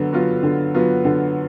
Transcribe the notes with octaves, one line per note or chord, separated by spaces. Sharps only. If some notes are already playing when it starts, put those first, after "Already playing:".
Already playing: D3 F#3 B3
F#3 B3 F4
D3
F#3 B3 F4
D3